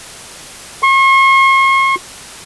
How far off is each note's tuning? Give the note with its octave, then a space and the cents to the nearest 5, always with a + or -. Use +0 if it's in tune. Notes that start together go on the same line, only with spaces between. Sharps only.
C#6 -45